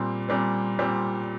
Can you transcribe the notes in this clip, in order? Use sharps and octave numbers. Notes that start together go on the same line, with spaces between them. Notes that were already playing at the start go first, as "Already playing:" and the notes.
Already playing: A#2 G3 C4
A#2 G3 C4
A#2 G3 C4